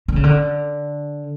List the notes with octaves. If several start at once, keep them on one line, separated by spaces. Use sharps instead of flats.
D3
C#3
D3